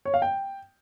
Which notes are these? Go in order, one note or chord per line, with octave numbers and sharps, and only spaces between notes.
C#5
F5
G5